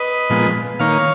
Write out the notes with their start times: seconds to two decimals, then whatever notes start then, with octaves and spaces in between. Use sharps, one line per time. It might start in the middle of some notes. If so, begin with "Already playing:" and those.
Already playing: B4 D#5
0.30 A#2 F3 G#3 B3
0.79 D#3 A#3 C#5 F5